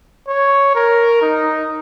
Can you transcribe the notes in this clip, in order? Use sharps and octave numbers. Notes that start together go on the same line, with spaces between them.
C#5
A#4
D#4